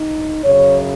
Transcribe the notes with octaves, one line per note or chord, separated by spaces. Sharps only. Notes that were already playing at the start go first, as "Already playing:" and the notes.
Already playing: D#4
F#2 C#3 C#5